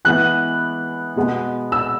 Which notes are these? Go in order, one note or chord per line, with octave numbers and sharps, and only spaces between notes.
E3 G#3 B3 F#6
B2 G#3 B3
E6